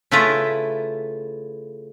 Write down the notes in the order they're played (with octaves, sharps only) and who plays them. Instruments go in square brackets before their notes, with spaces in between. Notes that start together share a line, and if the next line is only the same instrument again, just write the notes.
[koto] C#3 A3 E4 F4 B4 A#5